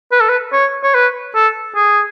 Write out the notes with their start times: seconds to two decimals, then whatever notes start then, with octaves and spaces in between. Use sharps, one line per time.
0.12 B4
0.21 A4
0.30 B4
0.53 C#5
0.83 C#5
0.95 B4
1.35 A4
1.76 G#4